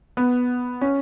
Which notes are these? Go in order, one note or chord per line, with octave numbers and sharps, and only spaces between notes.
B3
C#4